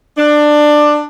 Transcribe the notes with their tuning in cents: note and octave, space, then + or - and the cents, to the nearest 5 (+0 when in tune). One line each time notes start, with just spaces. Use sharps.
D4 +15